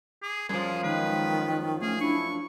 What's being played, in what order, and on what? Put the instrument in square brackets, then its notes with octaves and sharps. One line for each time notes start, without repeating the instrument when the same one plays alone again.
[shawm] G#4 [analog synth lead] D6
[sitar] F#2 F3 [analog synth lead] G3 [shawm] G#4
[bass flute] D#3 [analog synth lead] G#3 [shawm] B4
[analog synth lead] A3 [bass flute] C#4 [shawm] G#4
[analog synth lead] D4 [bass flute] E4 [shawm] C#6